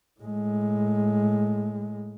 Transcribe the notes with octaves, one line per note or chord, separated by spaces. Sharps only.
A2 G#3